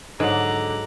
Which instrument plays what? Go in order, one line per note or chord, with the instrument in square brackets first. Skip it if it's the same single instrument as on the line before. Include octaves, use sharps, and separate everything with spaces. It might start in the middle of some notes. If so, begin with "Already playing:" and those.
[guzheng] G#2 F#3 [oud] D3 [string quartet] A#5 D6 F#6